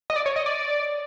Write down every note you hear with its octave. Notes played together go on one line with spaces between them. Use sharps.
D#5
D5
C#5
D#5
D5